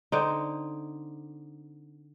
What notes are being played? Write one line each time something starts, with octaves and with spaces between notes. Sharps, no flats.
D3 C4 D#4